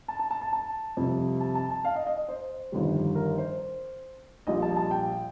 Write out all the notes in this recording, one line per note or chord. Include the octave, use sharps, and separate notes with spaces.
A5
A5
A5
A5
A5
F2 C3 G3
A5
A5
A5
F5
D#5
D#5
D#5
C5
G1 F2 D#3 G3
A#4
C5
A#1 A#2 G3 D#5
A5
A5
G5